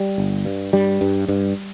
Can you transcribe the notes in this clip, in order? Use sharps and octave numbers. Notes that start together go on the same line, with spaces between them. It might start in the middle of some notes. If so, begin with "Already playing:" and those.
Already playing: G3
G1
G2
G2 G3
G2
G2